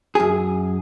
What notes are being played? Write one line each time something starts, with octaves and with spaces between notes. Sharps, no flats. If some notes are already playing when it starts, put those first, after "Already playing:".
F#2 G#4